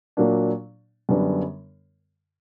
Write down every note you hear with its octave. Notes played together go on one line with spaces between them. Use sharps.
A#2 F#3 A#3 D4
F#2 D3 G3 B3 D4